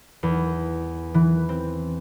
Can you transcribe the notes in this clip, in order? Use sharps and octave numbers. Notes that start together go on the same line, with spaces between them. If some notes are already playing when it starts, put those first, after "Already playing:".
E2
E3
C4